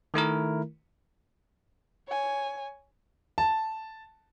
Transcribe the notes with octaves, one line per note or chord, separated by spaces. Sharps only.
D#3 A3 E4 A#4
C#5 G#5
A5